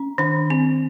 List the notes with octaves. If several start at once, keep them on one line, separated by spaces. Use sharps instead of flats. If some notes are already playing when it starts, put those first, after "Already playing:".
Already playing: C#4
D#3 D4
C4